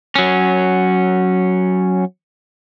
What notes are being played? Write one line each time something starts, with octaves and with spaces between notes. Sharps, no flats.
F#3 C#4